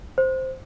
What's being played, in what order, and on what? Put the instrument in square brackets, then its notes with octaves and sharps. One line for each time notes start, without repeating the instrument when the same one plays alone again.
[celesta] C5